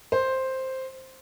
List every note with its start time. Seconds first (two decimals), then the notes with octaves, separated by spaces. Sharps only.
0.12 C5